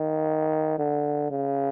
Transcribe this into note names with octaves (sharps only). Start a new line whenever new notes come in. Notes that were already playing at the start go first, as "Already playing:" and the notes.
Already playing: D#3
D3
C#3